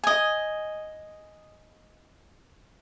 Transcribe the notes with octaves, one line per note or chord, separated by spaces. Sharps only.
D#5 G#5